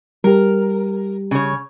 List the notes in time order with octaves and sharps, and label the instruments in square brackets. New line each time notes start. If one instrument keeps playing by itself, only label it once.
[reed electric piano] G3 G4 [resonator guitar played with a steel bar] A#4
[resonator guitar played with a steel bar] C#3 C#5